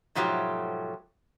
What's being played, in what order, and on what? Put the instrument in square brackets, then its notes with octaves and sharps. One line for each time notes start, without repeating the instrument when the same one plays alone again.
[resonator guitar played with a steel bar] G#2 B2 F3 F#3 A3 G4